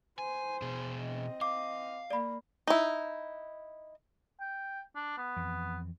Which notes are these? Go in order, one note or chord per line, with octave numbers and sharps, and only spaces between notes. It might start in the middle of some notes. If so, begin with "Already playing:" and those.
C5 G#5
B2 G#4
C4 D#5
F5 D6
A#3 D5 B5
D#4 E4
G5
D4
B3
F2 E3